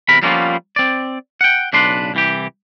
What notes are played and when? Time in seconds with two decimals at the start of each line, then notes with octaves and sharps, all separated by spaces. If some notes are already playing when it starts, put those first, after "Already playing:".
0.08 E2 C3 A#4 B5
0.22 F3 G3 A#3 B3 C#4 F4
0.76 C4 D5
1.41 F#5 G5
1.73 B1 C#3 D4 B4 C6
2.14 C2 E3 G4